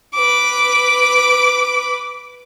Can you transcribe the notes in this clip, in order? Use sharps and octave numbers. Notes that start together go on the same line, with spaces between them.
B4 D6